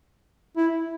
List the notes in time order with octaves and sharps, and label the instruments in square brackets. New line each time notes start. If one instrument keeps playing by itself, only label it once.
[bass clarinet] E4